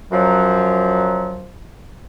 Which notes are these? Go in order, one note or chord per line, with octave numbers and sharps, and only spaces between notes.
F#2 F3 F#3